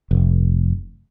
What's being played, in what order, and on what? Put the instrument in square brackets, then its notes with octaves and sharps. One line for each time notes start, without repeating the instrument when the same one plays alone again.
[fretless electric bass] F1